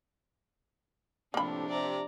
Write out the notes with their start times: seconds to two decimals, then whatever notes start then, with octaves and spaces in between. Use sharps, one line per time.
1.34 A2 C3 F3 A#3 D4 B5
1.69 C3 D5 A#5